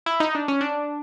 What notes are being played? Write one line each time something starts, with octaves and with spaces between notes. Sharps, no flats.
E4
D#4
D4
C#4
D4